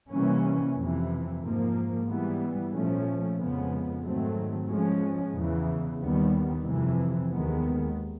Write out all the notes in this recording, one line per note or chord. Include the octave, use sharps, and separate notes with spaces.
C3 E3 G3 A#3 C#4
F2 C3 E3
G#2 F3 A#3
G#2 E3 G3 B3
A#2 F3 A3 C#4
F2 C#3 F3 G#3 B3
G#2 D#3 F#3 A3 C4
G#2 F3 G#3 C#4
E2 C#3 E3
D#2 D#3 G3 B3
F2 C3 E3
D#2 D#3 G#3 B3